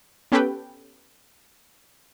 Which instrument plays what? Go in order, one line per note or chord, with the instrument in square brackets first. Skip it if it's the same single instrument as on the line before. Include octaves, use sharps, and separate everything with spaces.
[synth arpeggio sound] B3 C#4 G4 A4 B4 G5